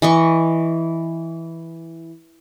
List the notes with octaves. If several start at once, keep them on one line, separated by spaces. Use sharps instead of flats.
E3 D#5 C#6